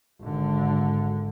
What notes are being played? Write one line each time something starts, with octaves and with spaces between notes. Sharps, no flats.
G#1 D3